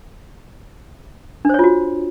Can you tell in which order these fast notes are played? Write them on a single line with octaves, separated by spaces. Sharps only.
D4 C5 C#5 F4 F#4